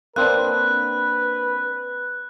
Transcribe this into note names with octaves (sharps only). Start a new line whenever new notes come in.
A#3 C4 D4 B4 F#6